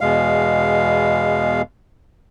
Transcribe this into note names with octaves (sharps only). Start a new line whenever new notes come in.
E2 B2 G#3 F5